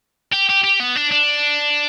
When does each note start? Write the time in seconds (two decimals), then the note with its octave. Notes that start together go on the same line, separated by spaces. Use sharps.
0.33 G4
0.49 G4
0.64 G4
0.80 B3
0.96 D4
1.11 D4